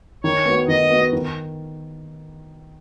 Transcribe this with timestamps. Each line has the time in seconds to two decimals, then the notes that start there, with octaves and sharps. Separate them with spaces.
0.23 D#3 C#5
0.46 B3 F#4
0.68 D#3 D#5
0.90 B3 F#4
1.13 D#3